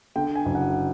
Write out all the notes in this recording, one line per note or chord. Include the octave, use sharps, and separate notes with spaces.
D3 G5
G#5
F#1
F#5